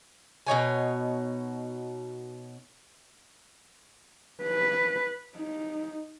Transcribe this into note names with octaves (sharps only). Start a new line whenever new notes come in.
B2 D#4 C#5 G#5
B4
D#4